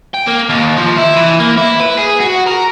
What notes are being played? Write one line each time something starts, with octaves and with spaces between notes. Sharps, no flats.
G5
A#3
D#2
F3
E4
E3
A#3
E4
B4
G#4
F#4
A#4